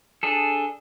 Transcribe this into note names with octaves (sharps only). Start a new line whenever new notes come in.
D4 G#4 A4